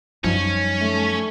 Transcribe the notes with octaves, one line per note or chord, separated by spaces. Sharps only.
F#2 F3 G3 C#4 D#4
A3